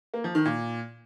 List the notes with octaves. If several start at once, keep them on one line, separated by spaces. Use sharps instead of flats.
A#3
F3
D#3
A#2